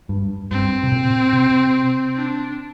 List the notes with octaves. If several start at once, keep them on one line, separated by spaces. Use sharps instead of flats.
G2
G2 C4
C3
A#2
C3
D4